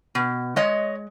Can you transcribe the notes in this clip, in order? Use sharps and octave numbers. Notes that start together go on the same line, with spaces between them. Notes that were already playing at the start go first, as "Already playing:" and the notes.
B2
G#3 C#5 D#5